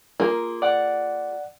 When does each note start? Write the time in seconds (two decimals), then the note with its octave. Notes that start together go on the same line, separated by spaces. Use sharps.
0.20 A#3 F4 G#4
0.62 D5 F#5